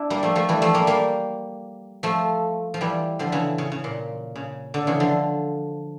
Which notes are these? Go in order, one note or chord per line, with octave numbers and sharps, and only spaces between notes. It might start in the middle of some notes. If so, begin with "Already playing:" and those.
Already playing: D4 E4
G3 A#3
F3 A3
F3 A3
E3 G3
F3 A3
G3 A#3
G3 A#3
F3 A3
F3
E3 G3
D3 F3
C#3 E3
C#3
C#3
A#2
C#3
D3
C#3 E3
D3 F3